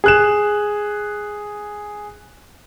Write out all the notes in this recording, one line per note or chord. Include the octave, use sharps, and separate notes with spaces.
G#4 F#6 E7